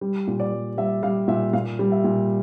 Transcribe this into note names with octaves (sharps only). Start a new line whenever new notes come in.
G3
A#2
D5
G3
G3 E5
G3 F5
A#2 E5
A#2 F5
G3
E5
A#2